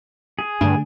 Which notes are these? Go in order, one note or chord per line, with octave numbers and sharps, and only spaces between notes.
G#4
G2 D3 A3 D4